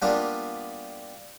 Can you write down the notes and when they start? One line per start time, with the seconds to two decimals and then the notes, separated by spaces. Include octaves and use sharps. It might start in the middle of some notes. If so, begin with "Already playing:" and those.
0.02 G3 A#3 B3 D4 F4